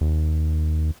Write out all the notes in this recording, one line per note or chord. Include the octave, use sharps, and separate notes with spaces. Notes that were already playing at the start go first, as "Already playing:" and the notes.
D#2